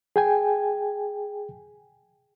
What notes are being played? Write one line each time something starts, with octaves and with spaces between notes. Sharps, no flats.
G#4 G5 G#5